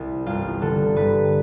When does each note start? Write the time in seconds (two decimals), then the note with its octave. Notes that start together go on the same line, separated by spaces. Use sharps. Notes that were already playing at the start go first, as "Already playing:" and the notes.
Already playing: C2 C3 E3
0.26 G1 F4
0.61 D3 A4
0.96 G2 B4